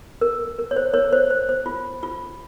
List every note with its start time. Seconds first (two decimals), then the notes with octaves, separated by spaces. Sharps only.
0.21 A#4
0.59 A#4
0.71 C#5
0.77 C5
0.94 A#4 C#5
1.13 C5
1.30 C5
1.49 C5
1.66 F4
2.03 F4